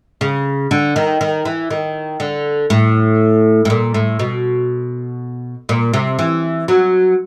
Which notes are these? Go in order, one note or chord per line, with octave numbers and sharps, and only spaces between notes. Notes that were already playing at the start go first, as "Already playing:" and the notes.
C#3
D3
D#3
D#3
E3
D#3
D3
A2
A2
A#2
A2
B2
A#2
C3
E3
F#3